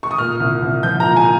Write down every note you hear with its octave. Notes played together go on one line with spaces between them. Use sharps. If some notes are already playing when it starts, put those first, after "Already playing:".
C#6
D#6
A#2 F6
C2
C2
F3 G6
A#2 A#5
G#5